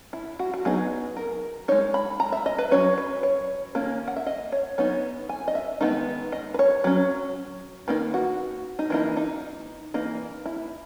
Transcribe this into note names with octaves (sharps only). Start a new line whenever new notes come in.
E4
F#4
F#4
F#3 B3 D#4 G#4
A#4
G#3 D#4 C#5
B5
A#5
E5
D#5
B4
F#3 C#4 C#5
B4
C#5
D#3 A#3 C#4
F#5
E5
D#5
C#5
F#3 B3 D#4 C#5
G#5
D#5
E5
D#3 G#3 B3 D#4
D#5
B4
C#5
F#3 C#4
D#3 A#3 D#4 B4
F#4
D#4
E3 A#3 D#4 E4
D#4
E3 A#3 D#4
E4